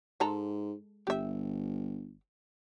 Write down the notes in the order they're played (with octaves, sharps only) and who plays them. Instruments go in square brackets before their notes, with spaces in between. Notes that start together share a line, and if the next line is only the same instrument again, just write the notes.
[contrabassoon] G#2 [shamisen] G#3 A4 A#5
[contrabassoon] G1 [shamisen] G4 E5